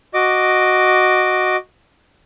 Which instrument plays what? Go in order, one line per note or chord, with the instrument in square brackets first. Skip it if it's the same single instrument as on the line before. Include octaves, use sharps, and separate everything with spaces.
[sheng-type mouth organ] F#4 D#5 D6